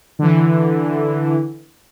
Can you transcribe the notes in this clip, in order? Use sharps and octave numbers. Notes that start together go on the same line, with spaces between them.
D3 E3